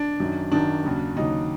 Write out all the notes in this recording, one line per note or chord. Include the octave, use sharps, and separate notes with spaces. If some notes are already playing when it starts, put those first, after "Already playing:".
Already playing: D4
F#2 D#3 F#3
F#2 D#3 F#3 D4
D#2 C#3 F#3
D#2 C#3 F#3 D#4